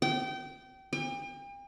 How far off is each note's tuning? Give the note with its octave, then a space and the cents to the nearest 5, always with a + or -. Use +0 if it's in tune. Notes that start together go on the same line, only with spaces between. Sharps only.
G5 -25
G5 +40